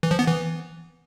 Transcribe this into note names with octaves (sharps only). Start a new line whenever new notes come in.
E3
F3
B3
E3